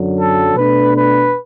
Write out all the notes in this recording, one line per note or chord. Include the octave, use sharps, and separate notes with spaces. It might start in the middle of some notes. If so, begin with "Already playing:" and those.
Already playing: F#2 D3 F#3
A4
B2 A3 D4 B4
B4